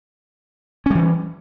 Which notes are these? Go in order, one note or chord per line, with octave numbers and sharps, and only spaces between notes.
E3 G3 C#4